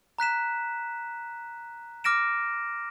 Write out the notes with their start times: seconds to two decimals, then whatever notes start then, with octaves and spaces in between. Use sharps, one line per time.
0.19 A#5 F#6 B6 E7
2.04 D6 F6 A#6 D7 E7